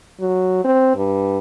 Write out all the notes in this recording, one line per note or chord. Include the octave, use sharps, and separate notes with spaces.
F#3
C4
G2